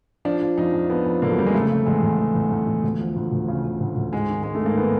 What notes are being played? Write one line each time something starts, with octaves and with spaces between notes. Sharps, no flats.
F3 D4
F3
F2 D#4
F2
F3 B3
F2
D3 A#3
F#3
F2 G3
G#3
C#3 A3
C#3
E2 G#3
E2
E2
E2
E2
E2
D2
F3
D2
D2
C#3
C#3
D2
D2
G#2 G#3
D#3
G#2 G#3
A3
G#2 A#3
D#3 B3